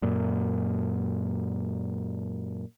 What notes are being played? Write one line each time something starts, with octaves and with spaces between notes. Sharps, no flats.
F#2 A#2